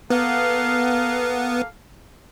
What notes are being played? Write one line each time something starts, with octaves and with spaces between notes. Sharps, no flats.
A#3 B3 A4 F5